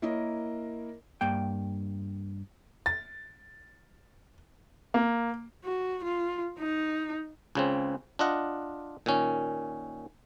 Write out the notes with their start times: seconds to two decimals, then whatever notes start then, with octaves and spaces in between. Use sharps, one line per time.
0.02 A#3 E4 A#4 C#5 D#5
1.21 G2 A#3 G5
2.86 A6
4.94 A#3
5.65 F#4
6.04 F4
6.59 D#4
7.55 C#2 C#3 C4
8.19 D4 F4 D#5 F#5
9.06 A#2 D#3 C#4